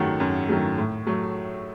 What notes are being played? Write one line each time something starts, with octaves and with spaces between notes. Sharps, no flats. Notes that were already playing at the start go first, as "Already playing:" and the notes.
Already playing: F#2 D#3 F#3 A3 F#5
F#2
D#3 F#3 A3
A2
F#3 A3